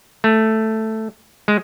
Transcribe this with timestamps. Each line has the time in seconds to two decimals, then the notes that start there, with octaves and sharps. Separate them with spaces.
0.24 A3
1.48 G#3